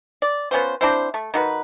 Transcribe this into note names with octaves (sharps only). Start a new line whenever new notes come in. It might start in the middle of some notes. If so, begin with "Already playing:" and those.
D5
B3 C#4 F4 C5
C4 D4 E4 C5
A3
D#3 F#4 B4